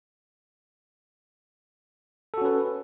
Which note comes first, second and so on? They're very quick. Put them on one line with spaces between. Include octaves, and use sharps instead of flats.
A4 F#4 C#4 B4